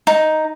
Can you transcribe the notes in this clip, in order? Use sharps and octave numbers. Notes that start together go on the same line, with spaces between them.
D#4